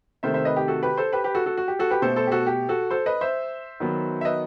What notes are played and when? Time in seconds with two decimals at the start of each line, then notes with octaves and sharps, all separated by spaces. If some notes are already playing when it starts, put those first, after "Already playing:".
0.23 C3 D#3 A3 C5 E5
0.34 C5 E5
0.45 B4 D#5
0.56 G4
0.68 F#4 A4
0.83 G4 B4
0.98 A4 C5
1.13 G4 B4
1.24 G4 B4
1.35 F#4 A4
1.46 F#4 A4
1.57 F#4
1.68 G4
1.79 F#4 A4
1.90 G4 B4
2.02 B2 A3 A4 C5
2.16 A4 C5
2.27 G4
2.32 F#4 A4
2.47 G4
2.69 F#4 A4
2.91 A4 C5
3.06 B4 D#5
3.21 C5 E5
3.80 D#3 F#3 B3
4.21 E5
4.25 B4 D#5